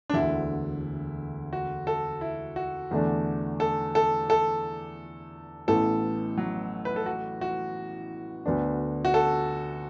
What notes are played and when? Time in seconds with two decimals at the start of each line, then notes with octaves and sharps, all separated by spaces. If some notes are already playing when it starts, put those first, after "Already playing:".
0.10 D4
0.13 E1 D2 D3 E4
1.53 F#4
1.87 A4
2.21 E4
2.56 F#4
2.91 E2 D3 A3 D4
3.60 A4
3.95 A4
4.30 A4
5.68 A1 A2 E3 B3 A4
6.37 F#3
6.85 B4
6.96 A4
7.06 F#4
7.41 F#4
8.46 D2 D3 B3 D4
9.05 F#4
9.14 A4